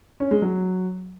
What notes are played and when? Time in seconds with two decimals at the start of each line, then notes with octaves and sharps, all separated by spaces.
0.20 C#4
0.31 G#3
0.42 F#3